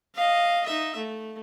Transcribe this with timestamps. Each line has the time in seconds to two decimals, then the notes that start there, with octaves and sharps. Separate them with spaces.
0.15 D#5 F5
0.66 D#4 E5
0.96 A3